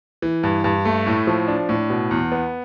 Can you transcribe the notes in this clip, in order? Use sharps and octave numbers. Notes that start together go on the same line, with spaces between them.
E3
G2
G2
A3
A2
F3
D4
A2
B2
E2
B3